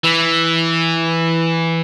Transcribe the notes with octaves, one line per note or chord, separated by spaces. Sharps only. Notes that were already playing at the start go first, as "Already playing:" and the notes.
E3